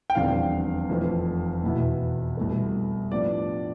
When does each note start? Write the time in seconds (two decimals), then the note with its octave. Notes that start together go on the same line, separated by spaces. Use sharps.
0.10 G5
0.15 F1 E2 D3 G3 C4 F5
0.89 F1 F2 E3 A3 C4
1.63 E2 B2 B3 E4
2.37 C2 B2 A3
3.12 A2 F3 B3 D4 D5